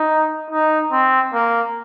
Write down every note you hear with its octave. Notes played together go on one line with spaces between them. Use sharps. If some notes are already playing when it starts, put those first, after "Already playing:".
Already playing: D#4
D#4
C4
A#3